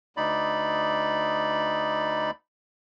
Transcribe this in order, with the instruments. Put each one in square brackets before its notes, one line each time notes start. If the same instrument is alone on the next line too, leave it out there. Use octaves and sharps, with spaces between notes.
[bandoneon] D2 D#4 D5 B5